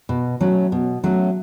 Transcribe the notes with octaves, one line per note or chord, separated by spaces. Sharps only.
B2
F#3 A3 C#4
B2
F#3 A3 C#4